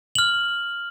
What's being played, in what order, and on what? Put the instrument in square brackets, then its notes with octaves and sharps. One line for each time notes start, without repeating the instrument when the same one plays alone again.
[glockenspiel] F6 F#7